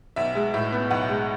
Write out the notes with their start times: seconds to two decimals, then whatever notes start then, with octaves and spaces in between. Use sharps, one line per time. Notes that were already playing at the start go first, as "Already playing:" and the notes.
0.16 B1 E5
0.35 G#3
0.54 A2 E5
0.72 B3
0.91 B1 F#5
1.09 G#3